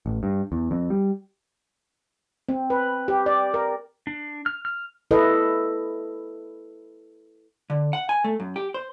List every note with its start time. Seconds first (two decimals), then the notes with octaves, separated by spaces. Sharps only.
0.06 A1
0.23 G2
0.52 E2
0.71 F2
0.90 G3
2.49 C4
2.70 B4
3.08 G4
3.26 D5
3.54 A#4
4.07 D4
4.46 F6
4.65 F6
5.11 E4 A4 B4 D#5
7.70 D3
7.93 F#5
8.09 G#5
8.24 A3
8.40 F#2
8.56 G4
8.74 C5